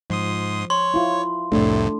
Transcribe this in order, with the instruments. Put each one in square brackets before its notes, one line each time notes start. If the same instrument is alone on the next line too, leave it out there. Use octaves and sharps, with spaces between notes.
[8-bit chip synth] G#2 C6 D#6 [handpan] F3
[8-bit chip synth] C#5 [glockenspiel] C6
[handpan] E4 F4
[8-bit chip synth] C2 F2 A2 [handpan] A3 D4